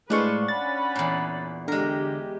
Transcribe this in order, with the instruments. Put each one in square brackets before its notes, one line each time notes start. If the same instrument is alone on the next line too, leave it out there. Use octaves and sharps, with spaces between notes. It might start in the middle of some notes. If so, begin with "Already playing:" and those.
[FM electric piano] A2 G#3 C#6 [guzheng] D4 F4 C5 [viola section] B4
[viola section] C#4 F#5 B5 [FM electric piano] A6
[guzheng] E2 A#2
[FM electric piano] D3 [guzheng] G#3 A#4 [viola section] G4